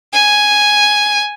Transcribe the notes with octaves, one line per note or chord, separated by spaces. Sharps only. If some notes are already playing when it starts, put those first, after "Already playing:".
G#5